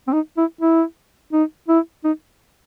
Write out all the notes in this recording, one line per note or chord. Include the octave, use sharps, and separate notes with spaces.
C4
D#4
E4
E4
D#4
E4
D#4